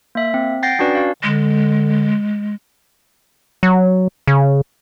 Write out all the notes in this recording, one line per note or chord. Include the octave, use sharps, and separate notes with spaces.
A#3 E5
C4
F#5 G5 G6 A6 A#6 C7
C#4 D4 F#4 B4 D5
F#4 F5
D3 G#3
F#3
C#3